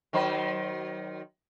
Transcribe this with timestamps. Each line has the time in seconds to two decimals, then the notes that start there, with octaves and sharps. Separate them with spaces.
0.13 D#3 F#3 C5